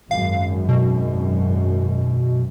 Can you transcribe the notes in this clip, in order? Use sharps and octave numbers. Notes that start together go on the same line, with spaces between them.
G#1 F#2 F5
B2